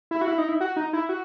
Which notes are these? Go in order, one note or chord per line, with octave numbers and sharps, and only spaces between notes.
E4
F#4
E4
D#4
E4
F#4
D#4
E4
F#4